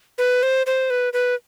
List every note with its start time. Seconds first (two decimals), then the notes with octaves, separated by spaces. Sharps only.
0.18 B4
0.43 C5
0.66 C5
0.90 B4
1.13 B4